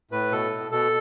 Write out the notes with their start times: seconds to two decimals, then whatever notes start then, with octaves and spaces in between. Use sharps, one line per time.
0.11 A2 B4
0.31 B2 A4
0.52 B2
0.71 B2 A4